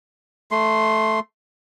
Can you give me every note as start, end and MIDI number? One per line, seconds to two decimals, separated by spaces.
0.51 1.20 57
0.51 1.20 84